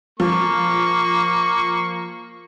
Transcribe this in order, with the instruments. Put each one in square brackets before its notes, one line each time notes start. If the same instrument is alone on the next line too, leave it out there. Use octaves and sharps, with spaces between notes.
[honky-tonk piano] F3 [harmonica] A#3 C#6